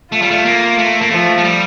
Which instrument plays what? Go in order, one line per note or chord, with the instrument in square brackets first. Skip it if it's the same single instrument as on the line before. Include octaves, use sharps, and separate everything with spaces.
[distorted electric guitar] A3 [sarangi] F4
[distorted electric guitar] G3
A3
A#3
A3
A#3
[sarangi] F3 [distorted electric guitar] A3
[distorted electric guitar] A3
G3